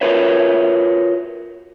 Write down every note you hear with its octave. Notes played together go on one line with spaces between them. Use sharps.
F4 F#4 A#4 B4 C#5 E5